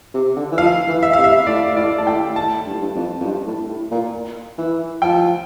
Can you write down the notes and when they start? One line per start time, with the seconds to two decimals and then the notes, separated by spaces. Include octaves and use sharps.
0.14 C3
0.36 D3
0.51 E3
0.58 F3 F5
0.88 E3
1.03 E5
1.13 C3 F5
1.24 E5
1.47 A2 D5
1.77 A2 D5
1.98 A5
2.07 A2 G5
2.36 A2 A5
2.66 G2
2.74 A2
2.81 G2
2.95 F2
3.20 F2
3.25 G2
3.47 A2
3.69 A2
3.91 A#2
4.58 E3
5.02 F3 G5